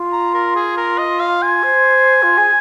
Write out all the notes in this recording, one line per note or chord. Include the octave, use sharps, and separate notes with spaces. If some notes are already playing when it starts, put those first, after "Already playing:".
Already playing: F4
A#5
A#4
G#4
A#4
D#5
F5
G#5
C5
F4
G#4